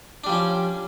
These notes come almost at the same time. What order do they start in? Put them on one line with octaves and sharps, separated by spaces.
D4 G3 F3 C#4